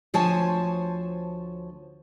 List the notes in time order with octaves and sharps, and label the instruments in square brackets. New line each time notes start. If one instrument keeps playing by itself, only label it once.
[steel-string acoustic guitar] D2 F3 C5 C#5 G#5 A5